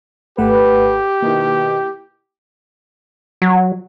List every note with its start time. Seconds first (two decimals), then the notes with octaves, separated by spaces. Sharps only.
0.38 G#1 A3 G4 B4 F#5
1.22 B2 D#3 A#3 E4
3.42 F#3